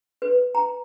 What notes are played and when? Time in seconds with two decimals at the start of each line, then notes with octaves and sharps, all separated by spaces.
0.22 B4
0.55 A#5